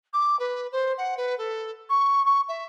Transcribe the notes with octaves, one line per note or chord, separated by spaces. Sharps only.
D6
B4
C5
F#5
B4
A4
C#6
C#6
E5